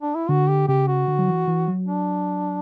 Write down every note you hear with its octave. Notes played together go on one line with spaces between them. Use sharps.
D4
E4
D3 F#4
G4
C#3 G4
F#4
D3
F#3
E3
E3
F#3
D4